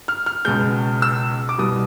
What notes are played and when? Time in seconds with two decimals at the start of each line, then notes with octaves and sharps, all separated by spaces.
0.08 F6
0.26 F6
0.45 C#2 B2 G#3 G6
1.02 E6
1.49 D6
1.58 C2 B2 G3 D#6